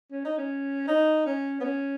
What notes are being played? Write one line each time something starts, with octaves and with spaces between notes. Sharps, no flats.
C#4
D#4
C#4
D#4
C#4
B3
C#4